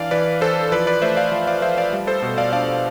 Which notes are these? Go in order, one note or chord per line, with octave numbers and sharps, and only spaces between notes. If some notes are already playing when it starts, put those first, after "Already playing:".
Already playing: E3 D4 D5 F5
E3 B4 D5
E3 A4 C5
F3 B4 D5
B4 D5
A3 C5 E5
D5 F5
F3
D5 F5
F3 C5 E5
D5 F5
G3
A4 C5
B2
D5 F5
D4 D5 F5